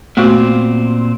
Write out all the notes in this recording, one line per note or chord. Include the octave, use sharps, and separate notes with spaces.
A#2 A3 B3 C4 F#4